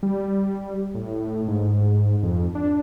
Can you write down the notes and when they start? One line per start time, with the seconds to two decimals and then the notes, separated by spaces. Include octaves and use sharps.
0.03 G3
0.94 A2
1.48 G#2
2.23 F2
2.55 D4